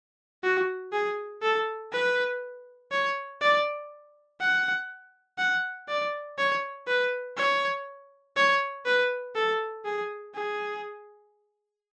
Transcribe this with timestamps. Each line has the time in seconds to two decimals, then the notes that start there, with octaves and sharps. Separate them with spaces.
0.43 F#4
0.92 G#4
1.42 A4
1.92 B4
2.91 C#5
3.41 D5
4.40 F#5
5.38 F#5
5.88 D5
6.38 C#5
6.87 B4
7.37 C#5
8.36 C#5
8.85 B4
9.35 A4
9.85 G#4
10.35 G#4